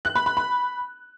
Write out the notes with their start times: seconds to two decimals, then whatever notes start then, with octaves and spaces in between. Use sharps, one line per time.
0.05 F#6
0.15 B5
0.26 B5
0.37 B5